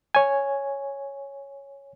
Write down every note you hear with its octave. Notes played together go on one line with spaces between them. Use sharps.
C#5 G#5